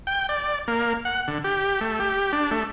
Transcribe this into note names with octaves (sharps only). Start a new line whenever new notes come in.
G5
D5
A#3
F#5
D3
G4
A3
G4
D4
A3